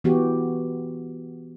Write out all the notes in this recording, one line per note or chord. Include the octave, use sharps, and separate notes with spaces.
E3 B3 F#4 G4